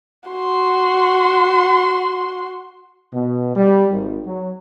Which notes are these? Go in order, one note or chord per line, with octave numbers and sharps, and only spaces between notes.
F#4 C6
B2
G3
G#1
F#3